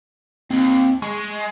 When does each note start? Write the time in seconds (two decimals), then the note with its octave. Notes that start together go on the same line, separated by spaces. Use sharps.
0.51 D#2 C4
1.02 G#3 G#5 C#6